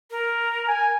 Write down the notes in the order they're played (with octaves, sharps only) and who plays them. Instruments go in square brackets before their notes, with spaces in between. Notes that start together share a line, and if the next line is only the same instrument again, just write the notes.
[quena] A#4
[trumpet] G#5